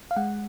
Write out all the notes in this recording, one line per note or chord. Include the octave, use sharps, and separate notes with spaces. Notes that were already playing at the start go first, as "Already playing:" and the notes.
F5
G#3 F#5